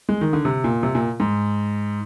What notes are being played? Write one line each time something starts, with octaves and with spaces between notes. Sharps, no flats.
G#3
D#3
D3
C3
A#2
C3
A#2
G#2